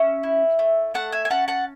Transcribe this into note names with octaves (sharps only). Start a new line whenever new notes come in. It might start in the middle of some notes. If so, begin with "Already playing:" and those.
Already playing: C#4 E5
E4
A3
A3 F#5 A5
E5 G#5
G#5
C#4 F#5 A5
F#5 A5